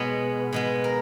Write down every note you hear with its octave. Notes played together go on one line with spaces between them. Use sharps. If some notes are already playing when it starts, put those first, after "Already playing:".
Already playing: B2 G#3 B3 C#5
B2 G#3 B3
A#4